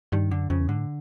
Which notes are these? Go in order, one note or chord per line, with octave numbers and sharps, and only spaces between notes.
G2 D#3
F#2 D3
F2 C#3
E2
G#2 D3
A2